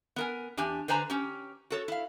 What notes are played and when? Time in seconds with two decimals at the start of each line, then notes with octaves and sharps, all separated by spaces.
0.16 B3 A#4 G#5
0.57 E2 D4 G4 G#5
0.88 D3 B4 C5 G#5 A#5
1.10 C#4 G4
1.70 F#4 A4 C#5
1.88 E4 F5